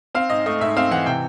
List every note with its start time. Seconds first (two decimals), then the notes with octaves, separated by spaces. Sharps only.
0.15 C4 F5
0.30 G#2 D#5
0.46 A3 D#5
0.60 G#2 E5
0.77 C4 F5
0.91 E3 F#5
1.06 C3 G5